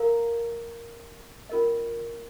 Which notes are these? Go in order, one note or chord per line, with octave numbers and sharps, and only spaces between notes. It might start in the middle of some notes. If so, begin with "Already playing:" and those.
Already playing: A#4 F5 A#5
C#4 F4 A#4 D#5